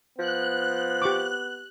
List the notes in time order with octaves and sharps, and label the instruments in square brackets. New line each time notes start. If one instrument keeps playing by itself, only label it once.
[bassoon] F3 [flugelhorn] B3 [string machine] F#6
[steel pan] G4 C#6 D6